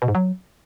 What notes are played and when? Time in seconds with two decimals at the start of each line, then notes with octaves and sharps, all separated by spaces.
0.02 B2
0.08 G#2
0.15 F#3